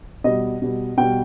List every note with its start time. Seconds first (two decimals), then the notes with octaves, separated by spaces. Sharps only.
0.24 B2 G3 D#5
0.62 B2 G3
0.98 B2 G3 G5